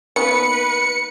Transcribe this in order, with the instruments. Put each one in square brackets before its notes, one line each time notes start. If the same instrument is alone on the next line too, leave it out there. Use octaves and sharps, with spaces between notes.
[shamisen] D#3 A#3 B3 [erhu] B4 [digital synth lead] C#7